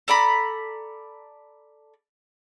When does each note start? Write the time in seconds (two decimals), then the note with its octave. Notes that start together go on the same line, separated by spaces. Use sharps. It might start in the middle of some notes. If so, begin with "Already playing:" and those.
0.08 A4 D5 A#5 B5